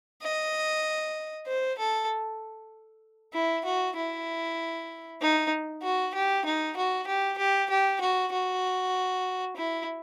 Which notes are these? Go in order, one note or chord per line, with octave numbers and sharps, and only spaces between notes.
D#5
C5
A4
E4
F#4
E4
D#4
F#4
G4
D#4
F#4
G4
G4
G4
F#4
F#4
E4